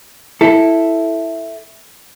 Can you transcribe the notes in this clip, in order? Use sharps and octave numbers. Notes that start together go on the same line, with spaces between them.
E4 A4